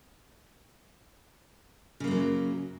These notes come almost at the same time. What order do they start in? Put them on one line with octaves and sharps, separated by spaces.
C#3 A#3 F#2 F#3